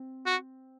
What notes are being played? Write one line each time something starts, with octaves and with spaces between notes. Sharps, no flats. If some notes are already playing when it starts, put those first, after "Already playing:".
Already playing: C4
F#4